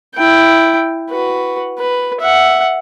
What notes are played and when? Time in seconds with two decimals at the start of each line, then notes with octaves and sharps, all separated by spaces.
0.15 E4 G5
1.10 F#4 B4
1.78 B4
2.21 E5 F#5